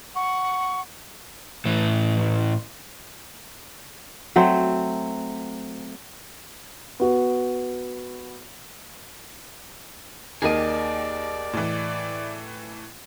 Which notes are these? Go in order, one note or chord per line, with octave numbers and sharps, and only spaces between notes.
F#5 C#6
A2 E3
F#3 A3 C4
B3 F#4
D#2 D#3 A#3 G#4 D5 D#5
A2 E3